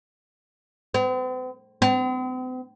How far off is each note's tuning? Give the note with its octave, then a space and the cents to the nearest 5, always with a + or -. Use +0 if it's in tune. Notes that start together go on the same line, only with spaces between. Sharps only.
C4 -45
C4 -45